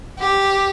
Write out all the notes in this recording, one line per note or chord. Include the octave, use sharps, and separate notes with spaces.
G4